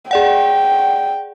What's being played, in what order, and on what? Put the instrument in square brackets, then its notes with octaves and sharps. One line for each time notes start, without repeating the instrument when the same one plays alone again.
[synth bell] G#4 D5 F#5 [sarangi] G5